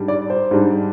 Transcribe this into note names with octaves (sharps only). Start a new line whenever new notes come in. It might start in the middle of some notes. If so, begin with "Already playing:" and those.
Already playing: G#2 G3 D4
D5
C5
G#2 G3 D4